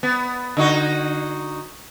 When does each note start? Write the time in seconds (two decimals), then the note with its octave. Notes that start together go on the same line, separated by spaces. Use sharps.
0.03 B3
0.57 D3 D#4 F#4